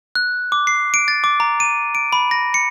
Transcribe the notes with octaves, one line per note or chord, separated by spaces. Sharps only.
F#6
D6
C7
D7
A6
D6
A#5
D#7
D7
B5
A#6
C#7